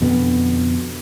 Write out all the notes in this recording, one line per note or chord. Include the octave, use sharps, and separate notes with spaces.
F2 B2 D3 B3